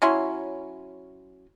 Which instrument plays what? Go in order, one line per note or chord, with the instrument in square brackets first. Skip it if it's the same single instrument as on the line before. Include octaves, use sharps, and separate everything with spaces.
[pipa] F#3 C#4 E4 C6